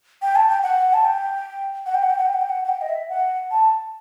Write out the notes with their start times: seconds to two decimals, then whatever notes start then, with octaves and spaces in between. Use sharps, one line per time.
0.22 G5
0.36 A5
0.48 G5
0.63 F#5
0.94 A5
1.05 G5
1.86 F#5
1.94 G5
2.02 F#5
2.10 G5
2.18 F#5
2.26 G5
2.33 F#5
2.41 G5
2.49 F#5
2.64 F#5
2.69 G5
2.81 D#5
2.89 E5
3.09 F#5
3.51 A5